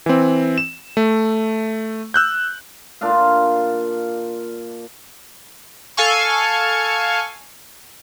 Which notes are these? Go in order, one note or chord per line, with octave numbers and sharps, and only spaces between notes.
E3 C4
E7
A3
E6 F#6 G6
A#2 D4 F4 F5
A4 F5 G#5 C#6